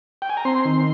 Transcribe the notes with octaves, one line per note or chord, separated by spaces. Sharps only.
G5
G#5
A#5
C4 C6
D#3